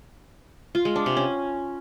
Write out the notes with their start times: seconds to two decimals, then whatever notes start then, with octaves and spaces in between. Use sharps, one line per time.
0.75 F4
0.85 G#3
0.96 D4
1.06 C3
1.17 C#4